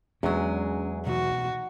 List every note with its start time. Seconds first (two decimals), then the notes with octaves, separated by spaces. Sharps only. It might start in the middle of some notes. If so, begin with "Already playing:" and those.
0.23 E2 F#3 G#3 C#4 D4 G#4
1.07 B2 E3 A3 D#4 F#4